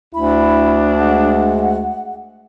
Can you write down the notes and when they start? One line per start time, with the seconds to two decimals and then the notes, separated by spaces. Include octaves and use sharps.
0.15 D2 D4 E4 B5
0.99 G#3 F#5